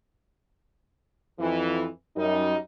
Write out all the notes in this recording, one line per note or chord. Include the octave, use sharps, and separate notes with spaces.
F2 E3
F#2 G3 D#4